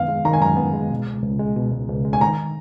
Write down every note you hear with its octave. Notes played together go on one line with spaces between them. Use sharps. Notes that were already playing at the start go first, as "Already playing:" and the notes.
Already playing: F#2 D#3 B3 F5
G#3
D#3 A#5
G#5
F#2 A#5
B3
G#3
B2
C#2
C#2
G#3
B2
C#2
C#2
G#3
G#5
D#3 A#5